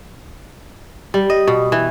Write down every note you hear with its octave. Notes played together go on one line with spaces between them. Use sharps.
G3
D#5
B2
E3